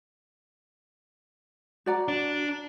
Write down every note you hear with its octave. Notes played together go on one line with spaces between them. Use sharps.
F#4 D5 A#5
D4